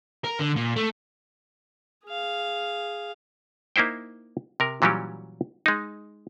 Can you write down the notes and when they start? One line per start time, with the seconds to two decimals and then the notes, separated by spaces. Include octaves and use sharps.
0.24 A#4
0.40 D3
0.56 A#2
0.76 A3
2.07 G#4 F5
3.76 A#3 D#4 E4 C5 G5
4.60 C3 A#4
4.82 A#2 E3 F#3 G3 C#4 G4
5.66 G#3 D#4